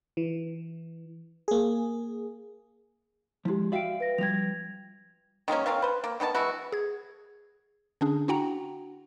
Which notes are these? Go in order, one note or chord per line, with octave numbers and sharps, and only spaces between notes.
E3
A#3 G#4
F3 G#3 E4 G4
F#4 D5 E5 F5 G5 D7
B4 A#6
F3 G3 G#6 A#6 F7
D#3 G#3 A#3 C#4
C4 A#4 C#5 F5
B4 C5
A#3
D#3 B3 G4 A5
E3 G#3 E4 F#4
G#4 G#6
D3 C#4 D4 G#4
D4 E4 F#4 F#5 G5 A#5